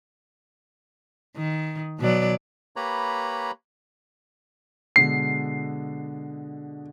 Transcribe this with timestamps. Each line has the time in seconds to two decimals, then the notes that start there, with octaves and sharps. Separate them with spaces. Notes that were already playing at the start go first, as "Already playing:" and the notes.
1.36 D#3
2.00 B2 F#3 D5
2.76 A#3 G4 B4 C#5 A#5 B5
4.96 B2 D3 G#3 C7